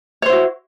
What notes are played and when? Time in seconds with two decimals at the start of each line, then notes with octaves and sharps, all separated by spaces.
0.22 C#5
0.26 C5
0.29 E4
0.33 F#4